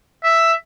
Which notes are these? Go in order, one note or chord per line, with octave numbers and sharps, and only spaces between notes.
E5